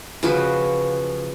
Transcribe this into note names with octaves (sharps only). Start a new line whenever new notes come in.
C#3 F3 F#4 B4